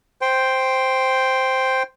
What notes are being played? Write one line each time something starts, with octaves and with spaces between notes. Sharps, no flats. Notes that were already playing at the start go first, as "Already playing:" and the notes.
C5 G5